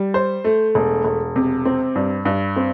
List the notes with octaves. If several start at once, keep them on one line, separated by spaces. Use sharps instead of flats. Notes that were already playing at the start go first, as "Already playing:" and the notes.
Already playing: G3
C5
A3
E1
E1
C3
C4
G2
G2
C4